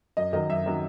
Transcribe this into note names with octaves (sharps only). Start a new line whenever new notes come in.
F#2 D#5
D#3 F#3 D#5
F#2 E5
D#3 F#3